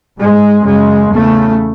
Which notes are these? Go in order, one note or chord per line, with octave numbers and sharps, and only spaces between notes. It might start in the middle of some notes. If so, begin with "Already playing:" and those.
G#2 G#3
F#2 C#3 G#3
E2 C#3 A3